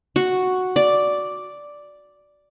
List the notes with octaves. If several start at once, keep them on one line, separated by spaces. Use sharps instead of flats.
F#4
D5